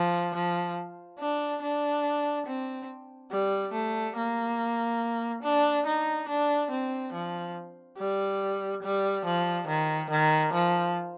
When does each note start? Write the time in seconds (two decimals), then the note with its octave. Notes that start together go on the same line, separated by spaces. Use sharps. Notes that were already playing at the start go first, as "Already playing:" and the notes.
Already playing: F3
0.35 F3
1.19 D4
1.62 D4
2.47 C4
3.31 G3
3.73 A3
4.17 A#3
5.43 D4
5.86 D#4
6.29 D4
6.71 C4
7.13 F3
7.98 G3
8.83 G3
9.25 F3
9.67 D#3
10.10 D#3
10.53 F3